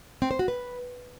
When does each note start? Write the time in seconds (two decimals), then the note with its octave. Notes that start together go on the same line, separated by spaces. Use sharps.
0.22 C4
0.31 C5
0.39 F#4
0.48 B4